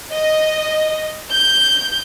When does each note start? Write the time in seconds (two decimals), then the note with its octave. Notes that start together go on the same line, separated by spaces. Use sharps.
0.14 D#5
1.30 G6